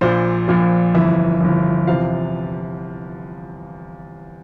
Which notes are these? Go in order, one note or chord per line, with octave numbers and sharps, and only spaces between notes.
A#1 A#2 F3 C5
A#1 A#2 F3
G1 F2 E3 E5
G1 F2 E3
E2 C3 F3 F5